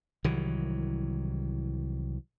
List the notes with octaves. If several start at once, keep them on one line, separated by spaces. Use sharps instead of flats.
C2 D#3 E3 F#3